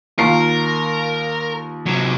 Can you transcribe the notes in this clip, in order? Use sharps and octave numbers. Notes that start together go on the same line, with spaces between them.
D#2 F4 A#4 C7
C3 F#3